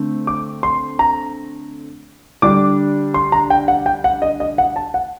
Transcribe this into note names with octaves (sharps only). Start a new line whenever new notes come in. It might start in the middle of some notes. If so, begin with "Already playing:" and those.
Already playing: D3 A3 C4
D6
C6
A#5
D3 G3 D4 D6
C6
A#5
G5
F#5
G5
F#5
D#5
D#5
F#5
A5
F#5